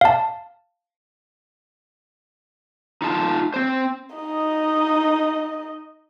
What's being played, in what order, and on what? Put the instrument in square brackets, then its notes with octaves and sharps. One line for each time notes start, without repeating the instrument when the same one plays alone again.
[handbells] F5 A5
[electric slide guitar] D#4 F4 A5
C4 C5
[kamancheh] D#4 D#5